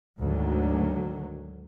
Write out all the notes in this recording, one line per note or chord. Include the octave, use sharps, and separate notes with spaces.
D2 G#2 D3 D#3 F#3